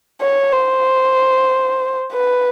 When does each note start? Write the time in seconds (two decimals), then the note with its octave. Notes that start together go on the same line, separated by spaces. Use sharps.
0.21 C#5
0.52 C5
2.13 B4